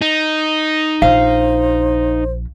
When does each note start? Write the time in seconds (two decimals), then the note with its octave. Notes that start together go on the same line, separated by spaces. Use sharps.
0.02 D#4
1.02 A#1 C5 F5